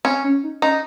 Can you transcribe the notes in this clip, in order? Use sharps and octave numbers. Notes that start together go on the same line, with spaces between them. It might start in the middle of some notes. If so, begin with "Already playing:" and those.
C4 C#4
C#4
D#4
C#4 D#4